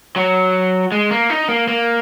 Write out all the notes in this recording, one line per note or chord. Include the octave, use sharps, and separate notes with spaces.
F#3
G#3
A#3
D#4
A#3
A#3